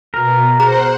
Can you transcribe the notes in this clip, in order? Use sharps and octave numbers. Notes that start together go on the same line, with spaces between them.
B2 A#4
G#4 C5 F#5 A#5